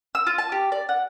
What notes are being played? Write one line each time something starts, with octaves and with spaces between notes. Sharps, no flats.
E6
F4
A5
G4
D5
F#5